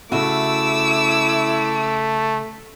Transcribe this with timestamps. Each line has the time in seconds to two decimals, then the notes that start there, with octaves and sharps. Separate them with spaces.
0.12 C#3 A3 E4 F#4 D6 E6